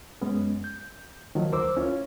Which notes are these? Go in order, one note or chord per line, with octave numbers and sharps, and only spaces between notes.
F#2 G#3 B3 C#4
G6
D#3 F3 F#3
D2 A#4 C5 D6 E6
C#4 E4 F4 C#5